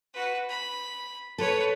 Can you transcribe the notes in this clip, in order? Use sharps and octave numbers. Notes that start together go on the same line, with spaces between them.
F#4 B4
B5
A4 B4 C#5